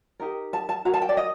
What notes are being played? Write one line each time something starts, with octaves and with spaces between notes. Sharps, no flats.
D#4 G4 A#4
A5
A5
F#4 A#4 A#5
A5
G5
D5
D#5